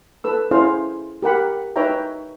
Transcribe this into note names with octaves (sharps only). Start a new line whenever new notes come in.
A4 B4 E6
C#4 E4 G#4 C5 F5
G4 A#4 F#5 B5
D#4 B4 C#5 E5 G5 A#5